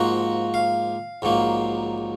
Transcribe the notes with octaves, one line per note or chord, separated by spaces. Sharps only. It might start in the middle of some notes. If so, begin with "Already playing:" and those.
Already playing: G#2 F3 A#3 F#4
F5
A#1 G#2 F#3 A#3